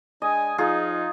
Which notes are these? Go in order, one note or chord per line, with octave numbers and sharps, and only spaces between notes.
G#3 D4 D#5 G#5
F3 D#4 F4 G#4